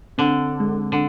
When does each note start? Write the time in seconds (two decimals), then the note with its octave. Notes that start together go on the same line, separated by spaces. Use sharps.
0.18 D3 C4
0.60 G#3
0.92 D3